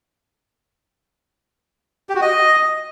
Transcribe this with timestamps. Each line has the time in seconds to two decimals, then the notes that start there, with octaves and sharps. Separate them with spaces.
2.09 G4
2.15 F#4
2.21 D#5